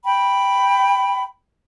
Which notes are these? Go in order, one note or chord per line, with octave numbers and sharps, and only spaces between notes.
G5 B5